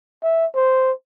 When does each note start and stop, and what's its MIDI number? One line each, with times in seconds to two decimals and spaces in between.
0.23 0.46 76
0.55 0.92 72